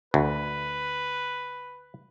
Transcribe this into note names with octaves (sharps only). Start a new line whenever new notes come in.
D2 B4